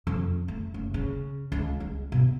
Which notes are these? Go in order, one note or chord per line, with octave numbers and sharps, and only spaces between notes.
F2
A3
F#1
C#3
C#2
G#3
B2